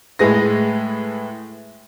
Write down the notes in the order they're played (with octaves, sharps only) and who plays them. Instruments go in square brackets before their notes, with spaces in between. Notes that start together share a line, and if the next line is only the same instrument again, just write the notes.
[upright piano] A2 G#3 G#4 B4 A#6